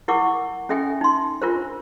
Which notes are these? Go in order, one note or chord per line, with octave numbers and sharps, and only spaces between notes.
E4 A#4 F#5 C#6 D6
C#4 A4 E5 G5 G#5
D#4 C6
D4 F4 A#4 C5